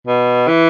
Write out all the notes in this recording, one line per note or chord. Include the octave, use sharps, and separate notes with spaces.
B2
E3